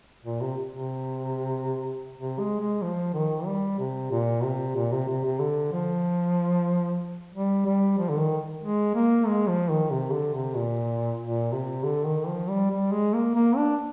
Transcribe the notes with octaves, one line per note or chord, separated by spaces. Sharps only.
A#2
C3
C3
C3
G#3
G#3
F3
D#3
G3
C3
A#2
C3
A#2
C3
C3
C3
D3
F3
G3
G3
F3
D3
D#3
G#3
A#3
G#3
F3
D#3
C3
D3
C3
A#2
A#2
C3
D3
D#3
F3
G3
G3
G#3
A#3
A#3
D4